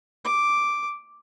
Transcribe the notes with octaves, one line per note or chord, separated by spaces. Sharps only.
D6